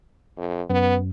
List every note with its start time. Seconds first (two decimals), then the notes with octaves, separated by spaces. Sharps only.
0.38 F2
0.70 F#2 B3